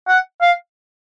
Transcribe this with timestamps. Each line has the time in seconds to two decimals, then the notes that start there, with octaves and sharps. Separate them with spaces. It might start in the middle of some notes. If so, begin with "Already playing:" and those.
0.08 F#5
0.42 F5